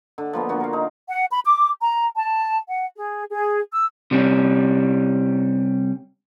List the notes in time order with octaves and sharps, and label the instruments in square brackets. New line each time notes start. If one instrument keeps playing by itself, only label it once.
[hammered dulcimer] D3
F3 A#3 B3
D3 A#3 F#4
A#4 F5
D#4
[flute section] F#5
B5
D6
A#5
A5
F#5
G#4
G#4
E6
[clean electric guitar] C3 G3 C#4